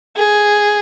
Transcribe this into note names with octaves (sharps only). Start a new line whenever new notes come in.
G#4